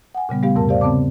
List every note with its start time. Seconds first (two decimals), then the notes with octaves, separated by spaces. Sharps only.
0.15 F#5 G#5
0.29 A#2 C#3 G3 B3
0.43 G3 A3 B3 G4 F5
0.55 E2 G#2 C3 A#4 A5
0.69 G4 C5 D5 F5
0.81 C#3 B3 C4 A5 D6